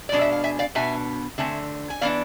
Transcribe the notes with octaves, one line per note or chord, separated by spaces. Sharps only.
B2 G#3 D4 D5
E5
F5
E5 G#5
D5 F5
B2 B3 D4 E5 G#5
D3 A3 C4 E5 G#5
G#5
E3 B3 D4 D5 F5